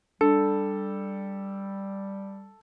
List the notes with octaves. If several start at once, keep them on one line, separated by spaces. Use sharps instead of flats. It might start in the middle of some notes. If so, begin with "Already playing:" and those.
G3 D4 A4